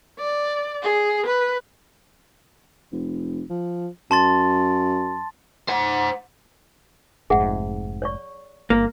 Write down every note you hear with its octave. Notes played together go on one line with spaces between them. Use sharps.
D5
G#4
B4
F1
F3
F#2 A5 C6 A6
C5 F#5
F1 G#2 G#4 E5 F#5
C#5 D5 C#6
G1 A#3